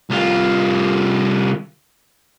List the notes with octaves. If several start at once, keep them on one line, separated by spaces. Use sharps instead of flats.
C2 F4